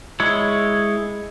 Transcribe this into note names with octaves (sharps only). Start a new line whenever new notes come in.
G#3 E4 C#5